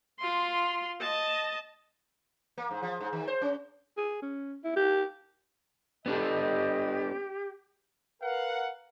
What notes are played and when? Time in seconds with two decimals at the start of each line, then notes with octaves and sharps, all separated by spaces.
0.20 F4 C6
1.01 D#5 A5
2.58 A#3
2.71 G#2
2.82 F3
3.00 G#2
3.13 D#3
3.28 C5
3.41 C#4
3.97 G#4
4.22 C#4
4.64 E4
4.76 G4
6.06 B3 D4 G4 A4 D#5
8.22 A#4 B4 F5 F#5